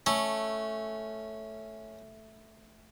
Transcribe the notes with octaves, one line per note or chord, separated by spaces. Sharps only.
A3 C#4